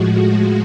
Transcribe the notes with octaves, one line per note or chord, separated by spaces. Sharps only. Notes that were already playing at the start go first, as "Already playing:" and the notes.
Already playing: A2 F3 G#3 F#4